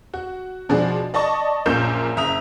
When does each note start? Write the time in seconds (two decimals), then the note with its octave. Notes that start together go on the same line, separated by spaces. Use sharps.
0.14 F#4
0.69 B2 F3 G#3 D4 F#4 G#4
1.14 D5 D#5 A5 C#6
1.66 A#1 F#2 A#2 A#4 G6 E7
2.17 F#1 E5 A#5 D#6 F7